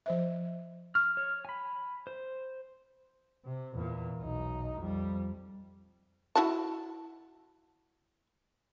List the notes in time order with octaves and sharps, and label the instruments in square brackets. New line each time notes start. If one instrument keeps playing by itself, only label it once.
[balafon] F3 C5 E5
[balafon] C#6 [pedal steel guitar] F6
[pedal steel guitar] C#5
G#5 B5
C5
[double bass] C3
E2 A#2
B1 D#4
F2 G3
[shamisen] E4 F#4 A5